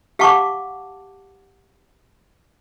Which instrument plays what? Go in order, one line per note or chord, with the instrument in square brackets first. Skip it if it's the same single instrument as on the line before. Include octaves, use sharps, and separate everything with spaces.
[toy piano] G4 F5 F#5 A5 C#6 D6